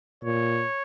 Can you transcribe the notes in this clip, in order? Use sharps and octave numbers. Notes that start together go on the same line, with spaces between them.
A#2 C#5